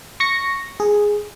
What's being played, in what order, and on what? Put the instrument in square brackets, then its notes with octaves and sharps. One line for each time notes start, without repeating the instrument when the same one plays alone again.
[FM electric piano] C#6 A#6 C#7
G#4